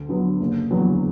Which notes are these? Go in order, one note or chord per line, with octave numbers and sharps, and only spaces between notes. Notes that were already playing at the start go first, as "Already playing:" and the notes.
Already playing: D2
D3 F#3 B3
F#1
E2 D3 F#3 B3